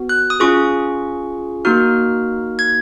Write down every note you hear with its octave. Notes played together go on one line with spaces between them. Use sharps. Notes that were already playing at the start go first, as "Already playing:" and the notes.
Already playing: B3 F#4
F#6
D#6
C#4 F4 G#4 C#6
A#3 D#4 F#4 F6
G#6